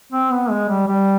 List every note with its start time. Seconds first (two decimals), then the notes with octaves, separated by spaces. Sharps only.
0.12 C4
0.32 B3
0.50 G#3
0.69 G3
0.88 G3